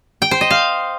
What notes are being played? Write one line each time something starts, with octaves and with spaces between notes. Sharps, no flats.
G5
C5
D#5
F5